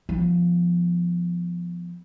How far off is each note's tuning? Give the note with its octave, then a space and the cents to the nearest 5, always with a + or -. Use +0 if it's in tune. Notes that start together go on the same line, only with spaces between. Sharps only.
F3 +0 B3 +0